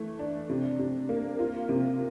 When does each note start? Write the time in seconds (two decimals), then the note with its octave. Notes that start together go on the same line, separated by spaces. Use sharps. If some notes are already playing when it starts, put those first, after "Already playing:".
Already playing: E3 A3
0.19 D4
0.50 C3
0.79 C3
1.09 A#3
1.39 F4
1.69 C3